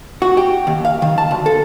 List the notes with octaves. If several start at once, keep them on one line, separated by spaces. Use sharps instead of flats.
F#4
G4
D#2
F5
D#3
A5
D2
A4